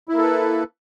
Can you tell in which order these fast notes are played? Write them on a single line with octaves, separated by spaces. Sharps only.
E4 A#3 A4 B4